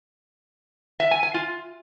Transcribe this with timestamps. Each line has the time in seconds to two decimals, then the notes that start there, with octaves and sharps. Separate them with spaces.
1.00 E5
1.11 G#5
1.23 G#5
1.34 F4